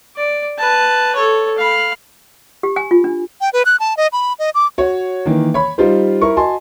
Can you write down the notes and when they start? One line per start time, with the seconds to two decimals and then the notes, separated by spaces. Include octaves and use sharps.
0.16 D5
0.59 B4 A5
1.15 A4 C#5
1.57 F5 B5
2.63 G4
2.76 G#5
2.91 F4
3.04 D4
3.41 G5
3.53 B4
3.66 F#6
3.80 A5
3.97 D#5
4.12 B5
4.39 D#5
4.55 D6
4.78 F#4 C#5
5.26 D#3 E3 A#3
5.54 C#5 B5
5.78 G3 D#4 F4 C5
6.21 E4 A#4 C#6
6.37 F#4 D#5 G#5 A5 C6